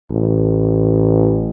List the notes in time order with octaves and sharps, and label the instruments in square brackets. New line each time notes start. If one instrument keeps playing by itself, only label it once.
[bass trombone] A1